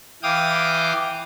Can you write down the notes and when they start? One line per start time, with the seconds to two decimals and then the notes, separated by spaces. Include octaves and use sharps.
0.23 E3 F5 G5 D6 D#6